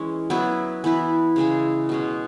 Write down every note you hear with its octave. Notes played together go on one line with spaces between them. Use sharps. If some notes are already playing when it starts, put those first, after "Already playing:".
Already playing: E3 G#3 C#4
F#3 B3 E4 B4
E3 B3 E4 B4
C#3 G#3 E4 G#4
B2 G#3 C#4